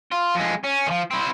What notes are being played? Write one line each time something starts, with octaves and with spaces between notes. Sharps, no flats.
F4
F2 G#3
C#4
D#3 F3
C4 E4